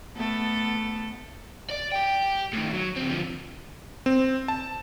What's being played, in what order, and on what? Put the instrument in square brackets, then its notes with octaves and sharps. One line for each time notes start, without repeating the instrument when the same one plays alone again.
[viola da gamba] A3 B3 A4
[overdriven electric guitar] D5
G4 G5
A2 D#3
F#3
D3 C4
D3 F3
[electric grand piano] C4
A5